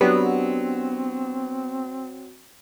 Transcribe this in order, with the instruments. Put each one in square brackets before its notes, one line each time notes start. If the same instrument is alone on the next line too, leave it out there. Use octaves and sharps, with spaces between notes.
[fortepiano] F#3 [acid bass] B3 [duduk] C4 [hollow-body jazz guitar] D4 G4 B4